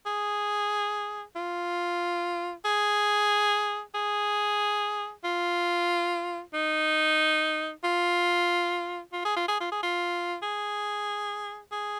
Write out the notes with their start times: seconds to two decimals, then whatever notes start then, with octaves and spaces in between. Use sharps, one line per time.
0.06 G#4
1.36 F4
2.65 G#4
3.95 G#4
5.24 F4
6.54 D#4
7.84 F4
9.13 F4
9.25 G#4
9.36 F4
9.48 G#4
9.60 F4
9.72 G#4
9.83 F4
10.42 G#4
11.72 G#4